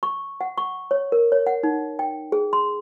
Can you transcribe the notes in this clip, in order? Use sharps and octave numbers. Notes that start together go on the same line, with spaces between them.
C#6
F#5
C#6
C#5
A#4
C#5
F#5
D#4
G5
G#4
C6